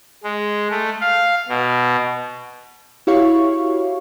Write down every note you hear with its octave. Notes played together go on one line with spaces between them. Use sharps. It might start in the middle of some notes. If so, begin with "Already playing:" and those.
G#3
A3
F5
B2
E4 F#4 G4 C#5 F5 C#6